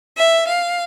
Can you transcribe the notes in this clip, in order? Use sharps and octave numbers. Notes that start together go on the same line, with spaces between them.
E5
F5